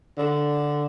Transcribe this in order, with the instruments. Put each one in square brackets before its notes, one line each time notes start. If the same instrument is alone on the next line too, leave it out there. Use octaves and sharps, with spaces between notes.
[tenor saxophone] D3